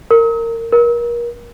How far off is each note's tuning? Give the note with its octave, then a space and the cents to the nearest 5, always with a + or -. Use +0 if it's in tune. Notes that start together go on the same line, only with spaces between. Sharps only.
A#4 -20
A#4 +30